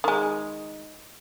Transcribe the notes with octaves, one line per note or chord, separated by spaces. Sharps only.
D#3 G#3